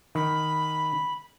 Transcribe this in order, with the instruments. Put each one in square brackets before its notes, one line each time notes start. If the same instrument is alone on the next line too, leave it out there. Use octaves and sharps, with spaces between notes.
[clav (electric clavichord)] D#3 [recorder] B5